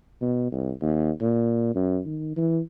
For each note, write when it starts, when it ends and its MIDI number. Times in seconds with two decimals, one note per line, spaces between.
0.22 0.47 47
0.52 0.71 36
0.82 1.10 39
1.21 1.75 46
1.75 1.99 42
2.06 2.32 51
2.36 2.59 52